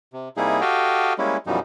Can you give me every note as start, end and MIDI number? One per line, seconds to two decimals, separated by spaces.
0.13 0.29 48
0.37 0.61 48
0.37 0.61 55
0.37 0.61 58
0.37 0.61 63
0.37 0.61 64
0.37 0.61 68
0.61 1.13 66
0.61 1.13 67
0.61 1.13 69
0.61 1.13 75
0.61 1.13 77
0.61 1.13 79
1.18 1.37 55
1.18 1.37 56
1.18 1.37 58
1.18 1.37 61
1.18 1.37 64
1.47 1.59 42
1.47 1.59 47
1.47 1.59 52
1.47 1.59 53
1.47 1.59 55
1.47 1.59 63